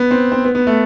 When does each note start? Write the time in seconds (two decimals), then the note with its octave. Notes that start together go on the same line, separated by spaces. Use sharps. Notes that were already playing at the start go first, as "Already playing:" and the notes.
Already playing: B3
0.11 C4
0.32 C4
0.45 B3
0.55 B3
0.67 A3